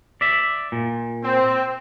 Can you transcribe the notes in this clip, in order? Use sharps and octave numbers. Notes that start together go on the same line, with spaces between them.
D5 E5
A#2
C4